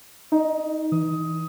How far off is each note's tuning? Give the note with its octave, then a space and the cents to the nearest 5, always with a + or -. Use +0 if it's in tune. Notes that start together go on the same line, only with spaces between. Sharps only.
D#4 +10 D#5 -45
E3 -15 D#6 +15